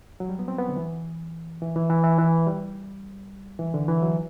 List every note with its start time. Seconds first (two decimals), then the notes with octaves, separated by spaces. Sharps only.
0.20 F#3
0.29 G3
0.39 B3
0.48 C4
0.59 B3
0.68 D3
0.76 E3
1.62 E3
1.76 E3
1.90 E3
2.04 E3
2.18 E3
2.47 G3
3.59 E3
3.74 D3
3.88 E3
4.02 F#3